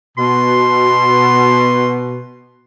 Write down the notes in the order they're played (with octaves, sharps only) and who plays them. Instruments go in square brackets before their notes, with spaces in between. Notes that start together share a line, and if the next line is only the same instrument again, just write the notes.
[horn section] B2 [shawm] C6